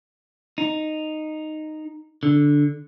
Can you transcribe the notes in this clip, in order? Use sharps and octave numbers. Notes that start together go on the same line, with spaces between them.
D#4
D3